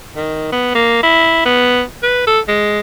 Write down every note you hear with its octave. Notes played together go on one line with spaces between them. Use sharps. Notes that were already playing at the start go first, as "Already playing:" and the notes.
D#3
B3
A#3
E4
B3
B4
A4
G#3